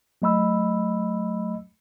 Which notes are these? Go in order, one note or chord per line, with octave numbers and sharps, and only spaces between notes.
F#3 A3 D#5 B5 E6